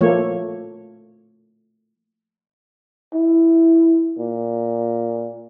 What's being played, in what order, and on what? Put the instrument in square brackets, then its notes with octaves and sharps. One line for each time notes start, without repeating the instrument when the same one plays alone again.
[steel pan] F3 A3 A#3 C#5
[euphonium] E4
A#2